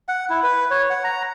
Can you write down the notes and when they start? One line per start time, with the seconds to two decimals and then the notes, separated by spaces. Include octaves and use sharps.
0.09 F#5
0.30 E4
0.43 B4
0.71 C#5
0.90 F#5
1.04 A#5